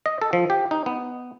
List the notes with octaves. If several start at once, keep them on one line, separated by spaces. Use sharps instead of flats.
D#5
A4
F3
G4
D#4
B3